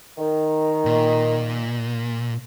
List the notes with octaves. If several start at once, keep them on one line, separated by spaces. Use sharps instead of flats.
D#3
A#2